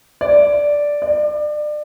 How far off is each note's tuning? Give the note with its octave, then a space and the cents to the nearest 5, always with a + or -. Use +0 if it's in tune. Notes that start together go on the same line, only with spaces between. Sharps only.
D5 -5
D5 +30